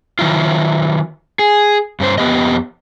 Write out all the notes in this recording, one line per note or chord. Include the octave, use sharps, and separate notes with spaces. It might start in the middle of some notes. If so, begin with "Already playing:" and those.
D#3 F#3 E4 F4
G#4
G2 C#4 C5
F2 B3 G4 D#5